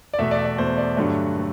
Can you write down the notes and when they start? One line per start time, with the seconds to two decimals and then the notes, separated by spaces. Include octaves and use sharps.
0.14 D5
0.18 E2 B2 A3 E5
0.31 D5
0.38 E5
0.45 D5
0.58 E2 B2 A3 C5
0.78 D5
0.97 G2 D3 F#3 A3
1.37 A3